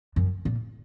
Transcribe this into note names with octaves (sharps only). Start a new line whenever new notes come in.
F#2
A#2